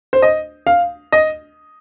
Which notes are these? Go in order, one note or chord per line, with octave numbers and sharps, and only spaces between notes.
C5
D#5
F5
D#5